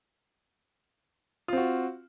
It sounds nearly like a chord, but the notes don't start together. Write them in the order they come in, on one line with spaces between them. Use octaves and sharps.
F4 C4 F#4